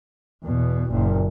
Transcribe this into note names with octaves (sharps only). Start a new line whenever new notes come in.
E2 B2
F#1 A#2